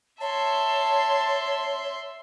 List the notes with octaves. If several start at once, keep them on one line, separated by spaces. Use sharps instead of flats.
C#5 E5 A5 C6